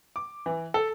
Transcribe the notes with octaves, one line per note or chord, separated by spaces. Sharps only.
D6
E3
A4